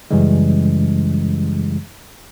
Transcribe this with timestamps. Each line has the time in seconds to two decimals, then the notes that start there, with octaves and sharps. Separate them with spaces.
0.11 F#2 C#3 E3 G3 G#3